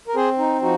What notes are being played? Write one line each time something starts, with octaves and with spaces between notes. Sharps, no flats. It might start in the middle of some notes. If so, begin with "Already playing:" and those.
A#4
C4 G#4 C5
D#4
F3 D#4 F#4